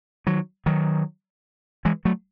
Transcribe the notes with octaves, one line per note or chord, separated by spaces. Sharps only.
D#3 F#3
D#3 F#3
E3 G#3
F#3 A3